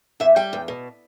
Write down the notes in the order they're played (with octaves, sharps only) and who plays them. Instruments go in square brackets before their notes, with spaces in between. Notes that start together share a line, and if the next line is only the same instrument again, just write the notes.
[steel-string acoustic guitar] E2 E5
G3 G5
E2
B2